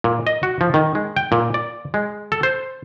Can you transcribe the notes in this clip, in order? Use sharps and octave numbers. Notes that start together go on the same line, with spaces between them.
A#2
D#5
F#4
F3
D#3
G#3
G5
A#2
D5
G#3
A4
C5